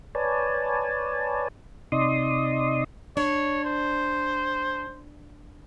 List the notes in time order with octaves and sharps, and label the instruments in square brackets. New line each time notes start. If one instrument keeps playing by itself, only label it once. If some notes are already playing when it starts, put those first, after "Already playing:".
[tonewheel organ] B4 C#5 D5 G#5 A5
C3 D#4 D5 D#5 C6 D#6
[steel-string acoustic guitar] D4 [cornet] C#5
[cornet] C5